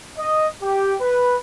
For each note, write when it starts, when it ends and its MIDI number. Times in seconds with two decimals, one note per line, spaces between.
0.18 0.47 75
0.62 0.95 67
1.01 1.37 71